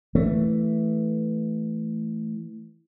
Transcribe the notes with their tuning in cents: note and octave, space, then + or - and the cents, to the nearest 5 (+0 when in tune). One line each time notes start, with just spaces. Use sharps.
E3 +0 A3 +0